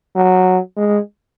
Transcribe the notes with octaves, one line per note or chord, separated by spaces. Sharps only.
F#3
G#3